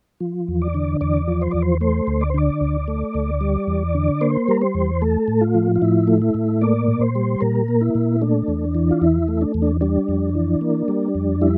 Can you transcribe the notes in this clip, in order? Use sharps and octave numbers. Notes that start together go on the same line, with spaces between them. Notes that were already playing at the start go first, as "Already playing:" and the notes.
F3
E2
D5
D3
E2 D5
F3
C5
E2 D5
C5
A3 C5
D2
D5
C5
D3 D5
D2
A3
D2
G3
E2
D3
A#3 C5
G3 A#4
C5
E2
A3 A4
A2
F4
F3
F4
A2 E4
A3
E4
A2
A#3 D5
A#2
C5
G3
A#2 A#4
A#3
E4
A#2
A3 D4
E2
E3
F4
E2 E4
A3
D4
E2
D4
G3 D4
F2
E3
A#3
G3
F2
G3 E4